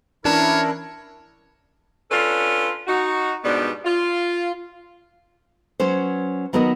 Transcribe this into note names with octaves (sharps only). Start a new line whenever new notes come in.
E3 C#4 D4 E4 A#4 C#5 A5
C#4 D4 F4 A4 B4
D#4 F#4
G#2 B2 G3 B3 D4
F4
F#3 C#4 B4 C5
D#3 F#3 B3 F#4 A#4 D#5